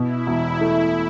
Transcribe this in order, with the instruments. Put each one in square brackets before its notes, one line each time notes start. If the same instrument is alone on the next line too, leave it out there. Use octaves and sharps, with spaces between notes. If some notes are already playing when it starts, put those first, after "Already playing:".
Already playing: [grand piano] B2 [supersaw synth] E4
[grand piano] E1
A3